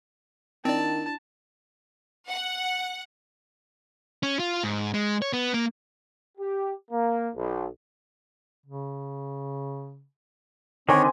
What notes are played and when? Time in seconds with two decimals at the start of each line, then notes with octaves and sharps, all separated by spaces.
0.65 D#3 C4 D4 E4 D5 A5
2.28 F#5
4.23 C#4
4.39 F4
4.63 G#2
4.94 G#3
5.22 C#5
5.33 B3
5.54 A#3
6.37 G4
6.90 A#3
7.34 B1
8.66 C#3
10.88 D3 D#3 C4 C5 C#5 G#5